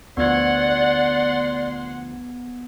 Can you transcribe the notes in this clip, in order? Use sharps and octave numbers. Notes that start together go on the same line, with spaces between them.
D2 F3 B3 D5 F#5 C6 G#6